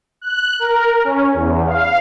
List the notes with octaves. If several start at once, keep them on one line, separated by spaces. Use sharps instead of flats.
F#6
A#4
C#4
E2
F5